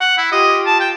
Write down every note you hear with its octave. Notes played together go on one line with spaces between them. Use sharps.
F#5
E4
F4 G4 D#5
A5
G5